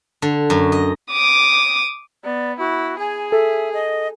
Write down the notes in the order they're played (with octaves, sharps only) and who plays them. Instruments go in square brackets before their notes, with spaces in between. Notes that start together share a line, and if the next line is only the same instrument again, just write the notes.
[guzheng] D3
F#2
D#5
[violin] D6 D#6
[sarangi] B3 [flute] D5
[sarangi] E4 [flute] F#4
[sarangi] G#4 [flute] G#5
[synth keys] A4 [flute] E5
[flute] D#5